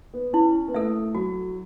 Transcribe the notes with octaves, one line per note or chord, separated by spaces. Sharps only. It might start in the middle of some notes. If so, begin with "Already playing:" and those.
B3
C#4 E4
B3
A3 A4 E5
F#3 F#4